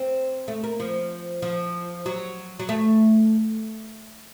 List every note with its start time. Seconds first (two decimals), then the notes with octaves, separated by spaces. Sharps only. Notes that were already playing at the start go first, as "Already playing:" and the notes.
Already playing: C4
0.48 A3
0.64 A#3
0.80 F3
1.42 F3
2.06 F#3
2.60 F#3
2.69 A3